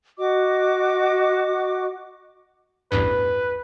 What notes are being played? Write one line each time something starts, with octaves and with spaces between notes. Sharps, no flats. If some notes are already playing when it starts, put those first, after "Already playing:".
F#4 D#5 D6
A1 E2 G2 B4